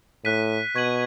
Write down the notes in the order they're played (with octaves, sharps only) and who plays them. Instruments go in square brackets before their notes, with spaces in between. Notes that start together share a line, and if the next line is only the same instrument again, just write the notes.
[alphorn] A2 [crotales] F#6 B6 D#7
[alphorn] B2 [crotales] C#6 G#6 D#7 F#7